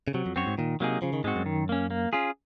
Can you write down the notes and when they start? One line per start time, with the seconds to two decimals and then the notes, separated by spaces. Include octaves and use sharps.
0.08 C#3
0.14 C3 F#3
0.26 F2
0.36 F#2 C4 F#4 C#5
0.47 G#2
0.58 A#2 D#3
0.80 C3 F#3 A#3 D#4 G#4
1.02 C#3 F3
1.13 D#3
1.24 G#2 G#3 C4 F#4
1.36 F#2
1.46 D#3
1.69 A#3 C#4
1.91 A#3
2.13 C#4 F4 G#4